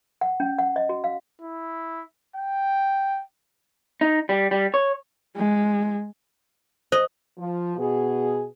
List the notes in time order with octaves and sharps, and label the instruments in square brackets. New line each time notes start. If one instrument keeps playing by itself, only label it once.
[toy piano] F#5
C#4
F#5
D#5
F#4
F5
[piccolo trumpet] E4
G5
[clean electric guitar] D#4
G3
G3
C#5
[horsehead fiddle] G#3
[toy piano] C5 [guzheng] D#5
[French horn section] F3
B2 G#4